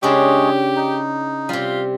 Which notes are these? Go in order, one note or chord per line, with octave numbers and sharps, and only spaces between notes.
C#3 G#3 D4 E4 G4 C#5
D#4
C3 G3 F4